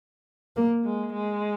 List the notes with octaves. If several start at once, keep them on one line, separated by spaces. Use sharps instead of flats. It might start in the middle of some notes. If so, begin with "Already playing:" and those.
A#3
G#3
G#3